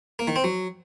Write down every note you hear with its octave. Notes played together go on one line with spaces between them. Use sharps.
A#3
D#3
C4
F#3